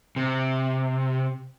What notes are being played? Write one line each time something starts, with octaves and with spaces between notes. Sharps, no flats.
C3